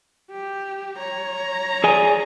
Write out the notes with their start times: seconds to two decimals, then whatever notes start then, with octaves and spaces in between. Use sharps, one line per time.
0.31 G4
0.97 C#5 A#5
1.84 G#4 D5 G#5